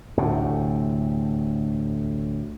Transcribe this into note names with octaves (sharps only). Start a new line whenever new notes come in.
D2 A2 C3